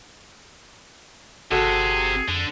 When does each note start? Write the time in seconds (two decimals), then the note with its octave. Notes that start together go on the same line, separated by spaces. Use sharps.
1.52 G1 C3 F#4 G#4 A4
2.28 F2 D3